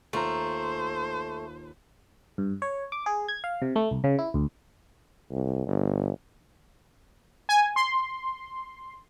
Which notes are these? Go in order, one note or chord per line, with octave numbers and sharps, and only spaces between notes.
D#2 A3 F4 C5 A#5
G2
C#5
D6
G#4
G#6
F5
C3
A3
C2
C#3
E4
D2
C2
G1
G#5
C6